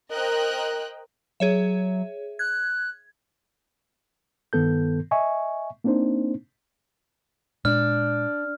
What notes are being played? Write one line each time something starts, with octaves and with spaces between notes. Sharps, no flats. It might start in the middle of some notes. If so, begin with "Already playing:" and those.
A#4 C5 D#5 G5 A#5 F#6
F#3 G#4 C#5 E5
F#6 G#6
G2 D#3 B3 A4 G6
D#5 E5 G#5 C#6
A#3 C4 D4 D#4 C5
A#2 G#3 D4 F6